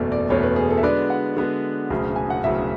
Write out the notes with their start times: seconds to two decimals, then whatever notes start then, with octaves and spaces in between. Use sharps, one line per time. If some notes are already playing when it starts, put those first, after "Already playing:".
Already playing: F#1 E2 B2 A3 D5
0.12 D5
0.29 F#1 E2 B2 A3 C#5
0.43 B4
0.56 G#4
0.70 A4
0.78 E5
0.83 D3 G#3 B3 F#4 B4 D5
1.10 F#5
1.36 D3 G#3 B3 F#4 B4
1.90 E1 D2 C#3 F#3
2.16 G#5
2.30 F#5
2.44 E1 D2 C#3 F#3 E5